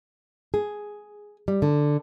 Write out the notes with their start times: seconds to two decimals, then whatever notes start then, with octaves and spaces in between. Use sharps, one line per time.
0.54 G#4
1.48 G3
1.62 D3